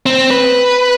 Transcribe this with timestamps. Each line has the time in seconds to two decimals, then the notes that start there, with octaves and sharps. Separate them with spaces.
0.06 C4
0.30 B4